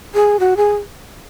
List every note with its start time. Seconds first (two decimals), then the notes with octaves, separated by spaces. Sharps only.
0.14 G#4
0.40 F#4
0.57 G#4